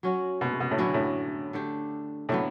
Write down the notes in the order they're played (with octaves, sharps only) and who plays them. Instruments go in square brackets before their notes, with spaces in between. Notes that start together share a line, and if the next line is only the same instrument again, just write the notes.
[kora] F#3 C#4 F#4
[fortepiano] B2
B2
A2
[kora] D3 F#3 C#4 E4
[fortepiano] A2
[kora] D3 A3 D4 G4
[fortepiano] A2 [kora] D3 F#3 B3